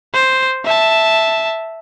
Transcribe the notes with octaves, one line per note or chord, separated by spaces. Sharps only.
C5
E5 A5